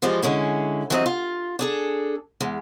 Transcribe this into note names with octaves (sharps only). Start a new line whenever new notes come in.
E3 F3 G3 G#3 F4
D3 G#3 C#4 E4
E3 F#3 G3 C4 E4 D#5
F4
D4 G#4 A4
E2 G#3